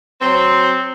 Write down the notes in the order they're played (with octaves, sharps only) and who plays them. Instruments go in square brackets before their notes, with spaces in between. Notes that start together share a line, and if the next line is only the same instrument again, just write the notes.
[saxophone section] F#3 C4